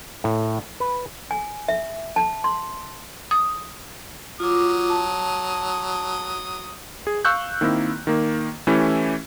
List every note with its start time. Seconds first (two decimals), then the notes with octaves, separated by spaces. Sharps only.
0.24 A2
0.80 B4
1.31 G#5
1.68 E5
2.16 A5
2.44 C6
3.31 D#6
4.40 F#3 F4 D6 D#6
4.90 A5
7.07 G#4
7.25 F5 C#6 E6 F#6 G6
7.61 D#3 A#3 C4 E4
8.07 D#3 A#3
8.67 E3 A3 C#4 E4 G4